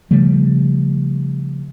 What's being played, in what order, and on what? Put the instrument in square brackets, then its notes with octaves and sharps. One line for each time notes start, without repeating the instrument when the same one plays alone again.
[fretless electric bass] C#3 F3 G3 A3